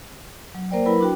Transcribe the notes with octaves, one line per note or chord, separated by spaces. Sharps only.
F#3
A#3 A#4 C5 D5 G5
F#3 E4 A#4 B4 B5
D4 F#4 G5